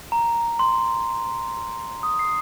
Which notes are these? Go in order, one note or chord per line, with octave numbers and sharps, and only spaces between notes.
A#5
C6
D#6
C7